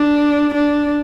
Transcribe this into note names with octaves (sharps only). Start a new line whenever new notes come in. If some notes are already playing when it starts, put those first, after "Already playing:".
Already playing: D4
D4